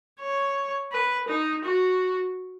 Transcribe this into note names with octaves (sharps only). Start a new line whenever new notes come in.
C#5
B4
D#4
F#4